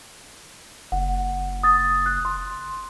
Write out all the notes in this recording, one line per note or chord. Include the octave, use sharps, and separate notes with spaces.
F#1 F#5
D#6 A6
F#6
C6